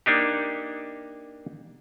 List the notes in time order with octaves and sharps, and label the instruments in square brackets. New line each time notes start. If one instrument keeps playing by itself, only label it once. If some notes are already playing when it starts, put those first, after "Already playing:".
[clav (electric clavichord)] A#3 D4 D#4 G4